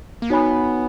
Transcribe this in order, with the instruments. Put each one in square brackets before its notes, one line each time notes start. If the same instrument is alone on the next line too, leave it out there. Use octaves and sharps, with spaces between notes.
[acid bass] A#3
[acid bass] B3 [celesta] D#4 F#4 C#5 G#5 B5